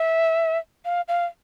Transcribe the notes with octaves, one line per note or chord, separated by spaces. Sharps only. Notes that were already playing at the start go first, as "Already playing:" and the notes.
Already playing: E5
F5
F5